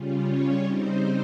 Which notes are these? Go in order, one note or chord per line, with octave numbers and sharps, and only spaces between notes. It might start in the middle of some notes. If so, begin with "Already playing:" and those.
Already playing: C#3 G3 C#4 F4
C#5
C#3 G3 C4 D#4 C5